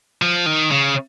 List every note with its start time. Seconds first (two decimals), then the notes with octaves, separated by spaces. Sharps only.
0.22 F3
0.46 D#3
0.71 C#3